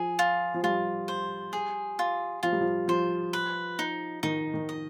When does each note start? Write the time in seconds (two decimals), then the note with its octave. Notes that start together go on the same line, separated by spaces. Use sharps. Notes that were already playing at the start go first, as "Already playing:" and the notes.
Already playing: F3 G#4
0.19 F4
0.54 F3
0.63 G3 F4
1.08 C5
1.53 G#4
1.99 F4
2.43 F3 F4
2.53 G3
2.61 F3
2.88 F3 C5
3.33 B4
3.79 D#4
4.23 D#3 D#4
4.54 D#3
4.69 D#5